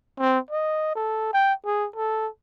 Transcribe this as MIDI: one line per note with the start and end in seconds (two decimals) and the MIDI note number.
0.19 0.39 60
0.51 0.92 75
0.96 1.29 69
1.33 1.53 79
1.66 1.87 68
1.96 2.28 69